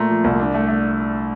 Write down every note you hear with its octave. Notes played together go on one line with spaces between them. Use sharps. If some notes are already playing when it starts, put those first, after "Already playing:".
Already playing: A#2 A3 A#5 C6
F3
C2
D4
A3
A3